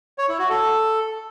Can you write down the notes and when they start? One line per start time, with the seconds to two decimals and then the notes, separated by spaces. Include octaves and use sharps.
0.18 C#5
0.29 E4
0.39 F#4
0.49 A4